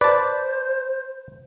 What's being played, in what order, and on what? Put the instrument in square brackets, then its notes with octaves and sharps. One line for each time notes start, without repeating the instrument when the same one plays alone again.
[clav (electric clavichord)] B4 A5 [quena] C5 [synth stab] D5